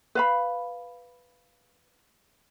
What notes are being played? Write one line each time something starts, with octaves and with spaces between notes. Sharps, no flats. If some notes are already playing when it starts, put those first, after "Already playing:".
B4 F5 B5